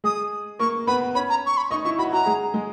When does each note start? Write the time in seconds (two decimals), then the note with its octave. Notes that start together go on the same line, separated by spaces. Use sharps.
0.04 G#3 G#4 D#6
0.59 A#3 A#4 C#6
0.87 B3 B4 B5
1.15 C#4 C#5 B5
1.29 A#5
1.46 C#6
1.57 B5
1.70 D#4 D#5 C#6
1.85 E4 E5 C#6
1.98 F#4 F#5 B5
2.12 F#4 F#5 A#5
2.26 G#3 G#4
2.54 G#3 G#4